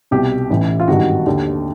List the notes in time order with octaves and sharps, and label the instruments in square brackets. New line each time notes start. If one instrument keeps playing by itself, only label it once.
[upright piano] C2 B2 G4
A1 A2 E3
F4
G#1 G2 D#3 F#4
D#2 D3